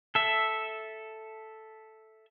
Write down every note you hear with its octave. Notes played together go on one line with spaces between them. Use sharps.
A4 E5